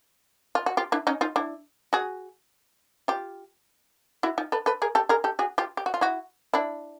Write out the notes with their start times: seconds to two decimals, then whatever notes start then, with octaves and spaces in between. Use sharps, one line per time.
0.55 F4
0.66 F#4
0.77 F4 G4
0.92 D4 E4
1.07 C#4 D#4
1.21 D#4 F4
1.36 D4 E4
1.93 F#4 G#4
3.08 F4 G4
4.23 E4 F#4
4.38 D#4 F4
4.52 A4 B4
4.66 A4 B4
4.82 G#4 A#4
4.95 G4 A4
5.09 G#4 A#4
5.24 G4 A4
5.39 F#4 G#4
5.58 F4 G4
5.77 G4
5.86 F#4
5.94 F4
6.01 E4 F#4
6.54 D4 E4